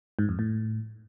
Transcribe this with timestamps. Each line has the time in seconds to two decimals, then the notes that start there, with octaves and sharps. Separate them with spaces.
0.19 G#2
0.29 F2
0.39 A2